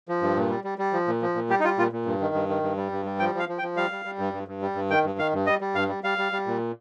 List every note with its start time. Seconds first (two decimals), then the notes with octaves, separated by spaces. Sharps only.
0.09 F3
0.22 G2
0.36 A#2
0.50 G3
0.64 G3
0.78 G3
0.93 F3
1.08 A#2
1.22 F3
1.35 A#2
1.49 G3 G4
1.60 D#4
1.64 G3 F4
1.78 A#2 F4
1.92 A#2
2.06 G2
2.21 D#3
2.34 G2
2.49 D#3
2.63 G2
2.77 G3
2.92 G2
3.06 G3
3.19 F3 G5
3.35 F3 F5
3.49 F3
3.58 G5
3.63 F3
3.76 G3 F5
3.91 G3
4.05 G3
4.19 G2
4.33 G2
4.48 G2
4.62 G3
4.75 G2
4.90 D#3 G5
5.04 G2
5.19 D#3 F5
5.33 G2
5.46 G3 D#5
5.61 G3
5.75 G2 F5
5.89 G3
6.04 G3 F5
6.18 G3
6.32 G3
6.47 A#2